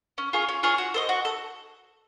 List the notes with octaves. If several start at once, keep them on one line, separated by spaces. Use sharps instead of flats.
C#4
F4 G#4 C#5
C#4
F4 G#4 C#5
F#4
A4 C5 D#5
F#4
A4